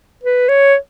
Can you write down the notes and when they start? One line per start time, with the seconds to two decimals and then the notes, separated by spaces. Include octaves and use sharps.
0.23 B4
0.49 C#5